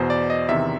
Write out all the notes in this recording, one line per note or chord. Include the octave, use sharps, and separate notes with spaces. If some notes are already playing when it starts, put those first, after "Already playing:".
Already playing: E2 B2 C5
D5
D#5
E2 C3 D#3 E5